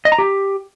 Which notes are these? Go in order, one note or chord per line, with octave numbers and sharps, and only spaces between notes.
D#5
A#5
G4